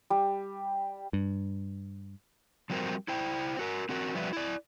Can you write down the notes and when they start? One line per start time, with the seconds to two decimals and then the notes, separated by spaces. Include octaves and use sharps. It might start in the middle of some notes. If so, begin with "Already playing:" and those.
0.10 G3
1.13 G2
2.70 F3 G3 C4 F#4 A#4 C5
3.08 E4 C5 G5
3.59 F#4 A#4
3.89 C4 F#4 A#4
4.15 F3 G3 F#4 B4 D5 E5
4.33 E4 D5